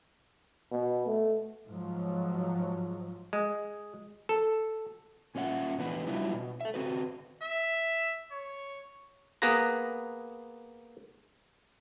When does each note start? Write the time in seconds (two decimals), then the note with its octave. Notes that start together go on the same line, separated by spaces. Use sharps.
0.72 B2
1.07 A3
1.69 G#2 F3 F#3
3.33 G#3
4.29 A4
5.35 A#2 C#4 F4 E5 F#5
5.78 C3 E3 B3 D4 B4
6.07 F#3 G3 D4 E4 F4 E5
6.33 B2
6.61 A4 E5
6.74 C4 F#4 B4
7.43 E5
8.31 C#5
9.42 A#3 B3 G#4 B4 A#5